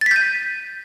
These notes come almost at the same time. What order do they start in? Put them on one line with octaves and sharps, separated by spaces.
A6 B6 G6 D#7